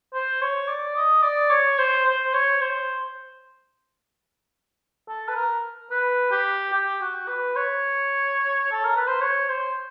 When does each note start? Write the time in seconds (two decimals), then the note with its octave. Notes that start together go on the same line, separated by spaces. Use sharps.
0.13 C5
0.41 C#5
0.68 D5
0.96 D#5
1.23 D5
1.50 C#5
1.78 C5
2.06 C5
2.34 C#5
2.61 C5
5.08 A4
5.28 B4
5.36 A#4
5.90 B4
6.31 G4
6.73 G4
7.01 F#4
7.28 B4
7.56 C#5
8.72 A4
8.84 A#4
8.96 B4
9.08 C5
9.20 C#5
9.49 C5